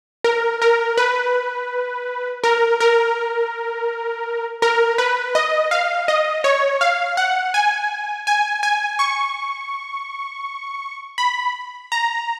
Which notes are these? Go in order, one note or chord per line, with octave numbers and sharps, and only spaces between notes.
A#4
A#4
B4
A#4
A#4
A#4
B4
D#5
F5
D#5
C#5
F5
F#5
G#5
G#5
G#5
C#6
B5
A#5